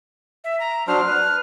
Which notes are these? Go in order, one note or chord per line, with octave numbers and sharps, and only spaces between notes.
E5
A#5
F#3 D4 C5 F6
B4